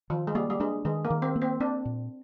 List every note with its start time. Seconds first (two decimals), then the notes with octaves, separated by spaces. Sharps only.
0.10 D#3 F3
0.27 G#3
0.35 G3 A#3
0.50 G3
0.60 G#3 D4
0.85 D#3 G#3
1.05 A#3
1.10 D#3
1.22 C4
1.36 A#3
1.42 C4
1.60 C4 D4
1.85 A#2